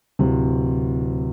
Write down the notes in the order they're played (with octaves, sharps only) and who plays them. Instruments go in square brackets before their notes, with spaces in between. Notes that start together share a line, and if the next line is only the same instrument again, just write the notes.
[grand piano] D1 C3